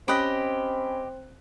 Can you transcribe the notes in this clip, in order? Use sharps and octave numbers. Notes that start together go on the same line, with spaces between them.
C4 C#4 G4 D#5 B5 F#6